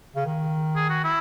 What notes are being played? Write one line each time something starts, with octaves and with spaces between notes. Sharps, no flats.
C#3
D#3
G#4
F#4
E4